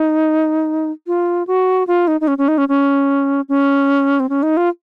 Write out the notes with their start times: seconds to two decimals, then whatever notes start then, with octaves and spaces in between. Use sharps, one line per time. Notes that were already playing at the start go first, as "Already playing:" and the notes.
Already playing: D#4
1.07 F4
1.47 F#4
1.87 F4
2.08 D#4
2.21 D#4
2.28 C#4
2.38 C#4
2.48 D#4
2.58 C#4
2.69 C#4
3.49 C#4
4.20 C4
4.29 C#4
4.43 D#4
4.57 F4